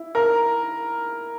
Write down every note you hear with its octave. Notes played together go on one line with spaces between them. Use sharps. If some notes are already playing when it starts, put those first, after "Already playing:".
Already playing: E4
A#4